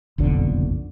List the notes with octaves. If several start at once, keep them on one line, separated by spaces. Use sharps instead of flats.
F#1 B1 F2 D3